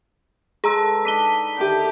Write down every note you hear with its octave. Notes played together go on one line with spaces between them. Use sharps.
G#3 G#4 A4 B4 A#5 E6
D4 D#4 B6 D#7 G7
D3 D#3 E4 G4